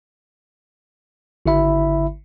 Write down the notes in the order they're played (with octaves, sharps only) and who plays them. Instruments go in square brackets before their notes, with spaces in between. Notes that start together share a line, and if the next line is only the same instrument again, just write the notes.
[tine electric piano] G#1 D3 E4 E5 B5